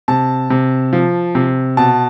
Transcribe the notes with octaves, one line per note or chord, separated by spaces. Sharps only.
C3 A5
C3
F3
C3
B2 A5